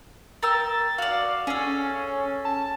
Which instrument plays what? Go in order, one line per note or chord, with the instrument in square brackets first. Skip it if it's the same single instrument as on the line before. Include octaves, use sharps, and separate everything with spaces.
[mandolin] A#4 G5 E6 [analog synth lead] A6
[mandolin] F#4 D5 [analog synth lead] F5
[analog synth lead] C#4 [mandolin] G#4 A4
[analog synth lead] A5